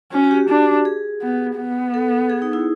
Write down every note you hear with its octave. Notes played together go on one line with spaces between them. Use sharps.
C#4 F#4
F#4
G4
D4
G#4
B3
B3
A4
G#4
D#4
E4